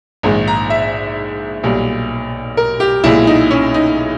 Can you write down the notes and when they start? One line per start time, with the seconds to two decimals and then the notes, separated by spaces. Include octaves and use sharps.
0.23 A#1 G#2 D#3 G#3
0.47 A#5
0.70 E5
1.64 B1 A#2 G3
2.57 A#4
2.80 G4
3.04 B1 A#2 G#3 E4
3.27 D#4
3.51 C#4
3.74 D#4